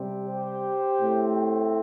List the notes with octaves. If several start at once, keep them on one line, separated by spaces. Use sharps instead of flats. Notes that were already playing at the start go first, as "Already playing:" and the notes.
Already playing: C3 G3 C4
G4 C5
A2 A3 C4